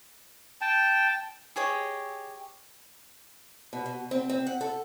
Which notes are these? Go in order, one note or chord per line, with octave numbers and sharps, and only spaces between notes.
G5 A5
G4 G#4 C#5 D#5
B2
B2
C4
C4
F#5
A4